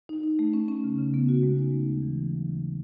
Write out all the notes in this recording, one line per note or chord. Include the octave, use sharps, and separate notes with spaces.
D#4
D#4
A3
C#4
C#4
C#3
C#3
B3
F#4
G#3
D#4
A3
D#2
E3
E3
F#3
C#3